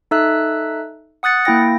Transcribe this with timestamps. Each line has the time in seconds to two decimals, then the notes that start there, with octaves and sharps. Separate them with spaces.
0.11 D#4 A4 E5 E6 F#6
1.23 F#5 D#6 F#6 A6 C#7
1.45 A#3 E4 G5 A#6